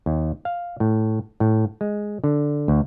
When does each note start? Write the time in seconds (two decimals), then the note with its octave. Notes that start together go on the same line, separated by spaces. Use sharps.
0.06 D#2
0.45 F5
0.80 A2
1.40 A2
1.81 G#3
2.24 D3
2.68 D2